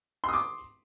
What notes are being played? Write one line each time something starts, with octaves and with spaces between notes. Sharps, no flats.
C6 D6 D#6